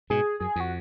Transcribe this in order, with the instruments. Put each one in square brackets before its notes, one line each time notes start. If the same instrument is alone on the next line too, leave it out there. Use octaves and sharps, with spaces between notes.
[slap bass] G#2 B2 [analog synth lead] G#4
[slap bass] F#2 [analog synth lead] G#4
[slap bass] F2 [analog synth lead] F#4